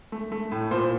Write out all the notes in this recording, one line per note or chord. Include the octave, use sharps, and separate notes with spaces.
A3
A3
A2
A#2 C5